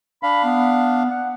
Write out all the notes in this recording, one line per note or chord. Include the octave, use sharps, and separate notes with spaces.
D4 F5 B5
B3
F#5